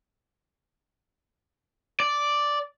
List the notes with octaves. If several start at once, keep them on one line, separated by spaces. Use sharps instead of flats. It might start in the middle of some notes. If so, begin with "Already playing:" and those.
D5